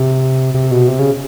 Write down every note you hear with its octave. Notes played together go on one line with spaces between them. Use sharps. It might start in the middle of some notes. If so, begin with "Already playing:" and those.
Already playing: C3
C3
B2
C3
C#3